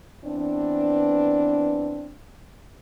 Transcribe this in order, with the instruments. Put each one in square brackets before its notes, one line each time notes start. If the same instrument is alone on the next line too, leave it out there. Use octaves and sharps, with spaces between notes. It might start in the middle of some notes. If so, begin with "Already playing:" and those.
[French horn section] E3 B3 C4 D4